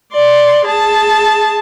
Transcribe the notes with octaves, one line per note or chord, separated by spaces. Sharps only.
D5 C6
G#4 A5